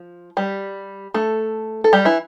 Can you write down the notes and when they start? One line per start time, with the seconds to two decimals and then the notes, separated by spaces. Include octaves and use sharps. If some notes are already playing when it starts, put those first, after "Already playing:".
Already playing: F3
0.37 G3 G4
1.14 A3 A4
1.84 A4
1.93 G3 G4
2.05 E3 E4